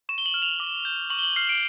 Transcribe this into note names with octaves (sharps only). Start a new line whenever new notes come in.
C#6 E7
G7
F#7
F6
F7
D6
G6
C#6 F#7
G7
F#7
F6 C7
D7